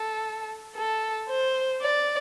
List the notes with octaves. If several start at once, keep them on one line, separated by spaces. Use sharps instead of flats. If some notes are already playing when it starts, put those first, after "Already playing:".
Already playing: A4
A4
C5
D5